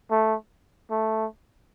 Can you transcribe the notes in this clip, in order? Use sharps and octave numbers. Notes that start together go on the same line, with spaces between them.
A3
A3